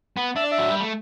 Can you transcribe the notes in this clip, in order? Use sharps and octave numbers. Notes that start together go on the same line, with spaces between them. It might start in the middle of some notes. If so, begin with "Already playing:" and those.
B3
D4 E5
D5
E5
F#3
G3
A3